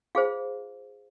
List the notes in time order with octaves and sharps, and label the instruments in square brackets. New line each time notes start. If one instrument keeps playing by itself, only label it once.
[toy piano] F4 G#4 C5 F5